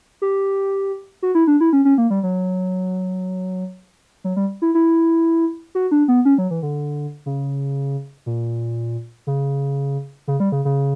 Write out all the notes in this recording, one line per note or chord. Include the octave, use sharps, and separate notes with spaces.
G4
F#4
E4
D4
E4
C#4
C#4
A#3
G3
F#3
F#3
G3
E4
E4
F#4
D4
B3
C#4
F#3
E3
D3
C#3
A#2
C#3
C#3
G3
C#3
C#3